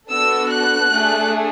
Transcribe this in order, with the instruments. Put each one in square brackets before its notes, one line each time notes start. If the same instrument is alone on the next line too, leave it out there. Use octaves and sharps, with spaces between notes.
[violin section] B3 D4 F#4 A4 E6
F#6
A3 D4 G#4